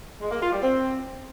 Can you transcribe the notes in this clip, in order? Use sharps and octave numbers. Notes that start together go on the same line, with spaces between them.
G#3
A#3
F4
G3
C4